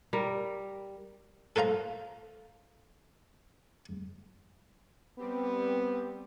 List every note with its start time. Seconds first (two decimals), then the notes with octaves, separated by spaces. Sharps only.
0.13 G3 A#4
1.56 A4 A#4 C5 F5 A#5
5.19 G3 B3 C4 G4